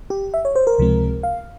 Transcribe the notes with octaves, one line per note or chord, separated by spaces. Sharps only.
G4
E5
C#5
C5
A#4
C#2 C3 F3 G#3 C4
F5